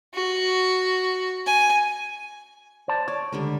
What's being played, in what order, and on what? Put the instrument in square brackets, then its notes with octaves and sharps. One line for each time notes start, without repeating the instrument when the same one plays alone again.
[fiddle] F#4
G#5
[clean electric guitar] C5 D5 A5
[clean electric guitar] C#5 [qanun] D5
[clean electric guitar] C#2 [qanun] D3 G3 A#4